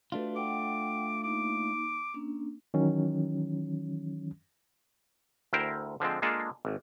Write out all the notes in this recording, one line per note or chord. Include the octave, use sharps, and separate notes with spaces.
A3 D4 F4 F#4 A4 B4
F#5 G5 D6
A#3 D#4 D6
A#3 C#4 D4
D#3 E3 F#3 C#4
D2 E4 A#4 C5 G5
D3 F3 G#3 C4
G#3 A#3 D4 F4 G#4 A4
G#1